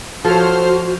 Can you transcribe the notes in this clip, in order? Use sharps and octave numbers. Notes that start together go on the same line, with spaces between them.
F3 F#4 A4 C5 C#5 F6